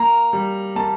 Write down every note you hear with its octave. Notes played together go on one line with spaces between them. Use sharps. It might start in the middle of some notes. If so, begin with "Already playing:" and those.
Already playing: A#3 A#5
G3
A#3 A5